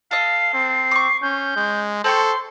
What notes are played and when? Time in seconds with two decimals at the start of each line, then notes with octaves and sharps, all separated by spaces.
0.11 A4 D#5 F5 C7
0.54 C4
0.91 C#6 D6
1.22 C#4 G6
1.56 G#3
2.04 C4 A4 G5 C6 C#6